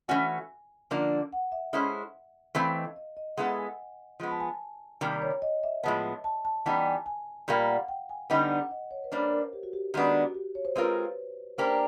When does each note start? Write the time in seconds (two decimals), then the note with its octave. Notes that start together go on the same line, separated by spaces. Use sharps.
0.08 E3 A3 C#4 F#4 G#5
0.91 D3 F3 A#3 D4
1.33 F#5
1.52 E5
1.73 G#3 C#4 E4 A4 C5
2.55 E3 A3 C4 F5
2.76 D#5
2.96 D#5
3.17 D#5
3.37 G#3 B3 E4 A4 F#5
3.58 G#5
4.20 F3 G#3 B3
4.31 A5
4.40 G#5
5.01 C3 D#3 G3 A#3 G5
5.22 C#5
5.42 D#5
5.63 E5
5.83 A2 F3 G#3 B3 A5
6.24 A5
6.45 A5
6.66 E3 G3 B3 D#4 G4 A5
6.86 G#5
7.06 G#5
7.48 A#2 G3 A#3 G5
7.59 F5
7.68 F#5
7.88 G5
8.09 G#5
8.30 D3 G3 B3 D#4 G5
8.51 F#5
8.71 D#5
8.91 C#5
9.04 B4
9.12 G3 A#3 D4 C5
9.32 A#4
9.53 G4
9.63 F#4
9.73 G4
9.94 D#3 G#3 B3 D4 F#4
10.24 F#4
10.35 G4
10.55 C#5
10.65 C5
10.76 G#3 C4 F4 A#4 B4
11.58 A#3 D4 G4 A#4 C5